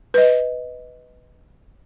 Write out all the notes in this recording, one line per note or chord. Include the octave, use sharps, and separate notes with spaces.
B4 D#5